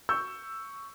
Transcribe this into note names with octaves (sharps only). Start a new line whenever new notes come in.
C#6 E6 G6